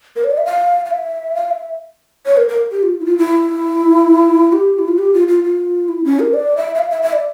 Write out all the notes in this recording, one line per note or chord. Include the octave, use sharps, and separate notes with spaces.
A#4
C#5
D5
E5
F5
F5
E5
F5
E5
C#5
A#4
A#4
G4
F4
E4
F4
E4
G4
E4
F4
G4
F4
F4
F4
E4
C#4
A#4
D5
E5
E5
F5
E5
E5
D5